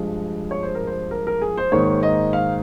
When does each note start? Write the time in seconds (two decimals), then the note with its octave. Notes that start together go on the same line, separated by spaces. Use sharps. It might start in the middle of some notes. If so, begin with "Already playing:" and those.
Already playing: G2 F3 G#3
0.51 C#5
0.63 C5
0.75 A#4
0.87 C5
1.11 A#4
1.27 A#4
1.42 G#4
1.57 C5
1.72 G#2 D#3 A#3 C#5
2.03 D#5
2.33 F5